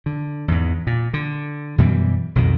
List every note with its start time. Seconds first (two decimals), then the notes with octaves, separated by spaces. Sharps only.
0.06 D3
0.48 E2 G#2
0.87 A#2
1.14 D3
1.78 F#2 B2 E3 G3
2.35 B1 F2 B2 D#3